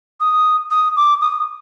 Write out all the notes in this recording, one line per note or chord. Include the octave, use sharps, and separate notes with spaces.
D#6
D#6
D6
D#6